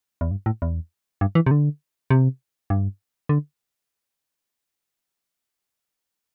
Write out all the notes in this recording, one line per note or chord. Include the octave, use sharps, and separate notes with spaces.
E2
G2
A2
E2
G2
E3
C3
D3
C3
G2
D3